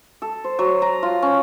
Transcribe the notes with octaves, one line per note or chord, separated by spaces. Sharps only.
A4
C5
F#3
A#5
F4
C#4